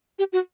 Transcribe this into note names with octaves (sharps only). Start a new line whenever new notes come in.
G4
F#4